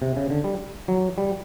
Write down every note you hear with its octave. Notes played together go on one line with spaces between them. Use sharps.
C3
C#3
D3
G3
F#3
G3